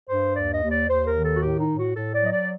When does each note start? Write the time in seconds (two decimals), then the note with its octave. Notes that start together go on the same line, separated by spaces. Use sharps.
0.09 G2 C5
0.36 D#2 D5
0.54 D#5
0.63 D#2
0.71 D5
0.89 D#2 C5
1.06 A#4
1.16 D#3
1.24 A4
1.34 F#4
1.42 A2 G4
1.60 D#4
1.69 A2
1.78 F#4
1.96 A2 A4
2.14 D5
2.23 F#3 D#5
2.32 D5